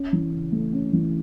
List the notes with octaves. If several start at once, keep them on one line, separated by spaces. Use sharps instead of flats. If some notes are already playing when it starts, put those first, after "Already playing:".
Already playing: C#4
E3
C#3
A3
C#4
E3